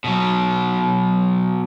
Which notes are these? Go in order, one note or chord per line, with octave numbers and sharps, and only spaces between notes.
B2 F#3